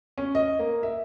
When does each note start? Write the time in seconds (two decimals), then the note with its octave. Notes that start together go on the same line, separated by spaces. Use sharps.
0.18 C#4
0.35 D#5
0.59 A#3
0.83 E5